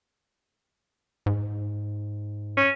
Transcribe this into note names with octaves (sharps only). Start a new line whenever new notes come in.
G#2
C#4